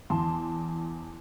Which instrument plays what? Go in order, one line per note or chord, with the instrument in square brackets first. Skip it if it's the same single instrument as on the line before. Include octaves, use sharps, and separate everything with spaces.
[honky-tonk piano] E2 A5 C6